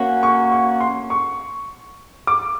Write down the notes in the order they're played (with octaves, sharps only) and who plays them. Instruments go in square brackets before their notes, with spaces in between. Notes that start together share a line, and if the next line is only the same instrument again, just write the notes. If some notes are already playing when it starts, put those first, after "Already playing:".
Already playing: [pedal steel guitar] A#3 C#4 F#4
[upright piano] C#6
C#6
C6
C#6
D6